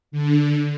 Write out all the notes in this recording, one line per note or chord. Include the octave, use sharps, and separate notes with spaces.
D3